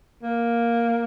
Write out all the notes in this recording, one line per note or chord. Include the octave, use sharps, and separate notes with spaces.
A#3